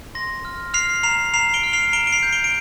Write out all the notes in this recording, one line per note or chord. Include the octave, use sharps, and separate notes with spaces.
C6 A#6
F6
F6 C7 F7
A#5 C7 F7
A#5 C7 F7
D7 G7
F6
C7 F7
A#5 D7 G7
D7
C7 F7
G6
D7 G7
D7